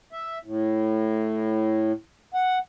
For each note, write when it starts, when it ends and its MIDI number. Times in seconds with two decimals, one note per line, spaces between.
0.13 0.38 76
0.45 1.92 45
2.34 2.59 78